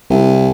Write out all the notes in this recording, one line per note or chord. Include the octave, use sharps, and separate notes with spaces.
C2